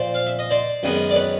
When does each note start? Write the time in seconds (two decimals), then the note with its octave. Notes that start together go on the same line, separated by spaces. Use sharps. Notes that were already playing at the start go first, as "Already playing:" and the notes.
Already playing: A#2 F3 C5 D5
0.14 F5
0.27 E5
0.39 D#5
0.51 C5 D5
0.83 F#2 D#3 G#3 B3
1.11 D5
1.15 B4 C#5